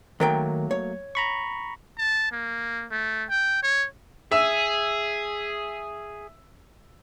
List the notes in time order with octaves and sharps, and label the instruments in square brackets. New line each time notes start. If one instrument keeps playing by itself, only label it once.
[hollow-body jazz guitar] D#3 A#4 G5 [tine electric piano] F#3 A3 A#3
[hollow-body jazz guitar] C#5
[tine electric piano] A#5 B5 C#6
[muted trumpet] A5
A#3
A3
G5
C#5
[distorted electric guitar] G#4 [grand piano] E5 E6